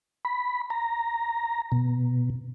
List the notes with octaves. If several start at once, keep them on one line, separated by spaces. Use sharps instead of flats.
B5
A#5
B2